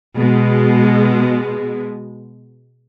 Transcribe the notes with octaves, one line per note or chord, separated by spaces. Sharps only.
B2 G#3